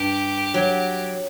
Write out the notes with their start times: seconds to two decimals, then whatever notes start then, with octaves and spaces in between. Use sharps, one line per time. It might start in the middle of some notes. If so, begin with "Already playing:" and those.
Already playing: G2 G4
0.54 F#3